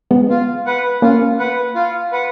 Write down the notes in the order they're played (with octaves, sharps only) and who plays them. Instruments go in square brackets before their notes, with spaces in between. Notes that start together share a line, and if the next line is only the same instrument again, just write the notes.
[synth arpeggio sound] G#3 B3
[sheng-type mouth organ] F4
B4 F#5
[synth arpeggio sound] A#3 C#4 [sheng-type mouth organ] F4
[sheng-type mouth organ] B4 F#5
F4
B4 F#5